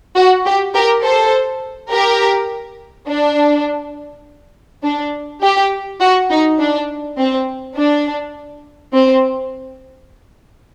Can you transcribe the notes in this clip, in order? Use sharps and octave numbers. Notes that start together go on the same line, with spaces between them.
F#4
G4
G4 A#4
A4 C5
G4 A#4
D4
D4
G4
F#4
D#4
D4
C4
D4
C4